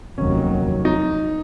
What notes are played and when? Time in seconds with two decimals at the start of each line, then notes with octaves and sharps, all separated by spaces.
0.18 F1 D#2 D#3 F#3 C#4
0.85 D#4